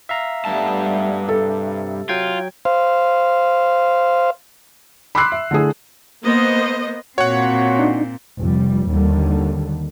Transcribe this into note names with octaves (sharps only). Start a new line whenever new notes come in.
E5 F5 A#5
G2 G3 A3 B3 A5
C3 A4
F#3 F4 G5 G#6
C5 F5
B5 C6 D6 E6 F#6 C7
E5
D3 A3 E4 G#4
A#3 B3 C5 D#5
A#2 C4 F#4 C#5 F#5
D4 D#4
F1 G3
D#2 D3 D#3 G3